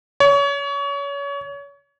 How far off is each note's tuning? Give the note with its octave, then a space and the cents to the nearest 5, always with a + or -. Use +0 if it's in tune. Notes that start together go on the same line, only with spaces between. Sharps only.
C#5 +30